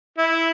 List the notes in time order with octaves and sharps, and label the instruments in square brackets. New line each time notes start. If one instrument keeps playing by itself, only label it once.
[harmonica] E4